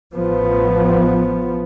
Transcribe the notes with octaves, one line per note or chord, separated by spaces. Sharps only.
A1 F3 B3